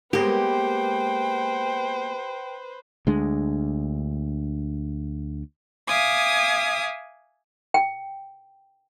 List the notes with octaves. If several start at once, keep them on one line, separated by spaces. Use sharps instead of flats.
G#3 A#3 B3 G4 B4 C5 G5
D2 G#3 D4
E5 F5 G#5 D6 D#6
G5